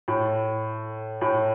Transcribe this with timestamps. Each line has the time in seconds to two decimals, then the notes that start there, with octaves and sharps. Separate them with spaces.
0.08 A2
1.21 A2